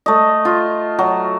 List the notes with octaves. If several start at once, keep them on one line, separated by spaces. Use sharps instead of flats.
A3 D#5
F4
F#3